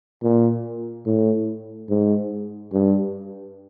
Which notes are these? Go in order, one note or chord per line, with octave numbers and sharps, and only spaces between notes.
A#2
A2
G#2
G2